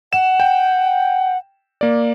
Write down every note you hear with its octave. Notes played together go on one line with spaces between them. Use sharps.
F#5 E7
G5
A#3 D5